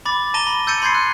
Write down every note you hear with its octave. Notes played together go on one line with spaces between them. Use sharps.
B5 D6 A6
A5 A#5 A#6 D#7 G7
B5
E6 G6 A6 C#7 D#7
B5 C6 G6 G#6 C7 C#7
F#6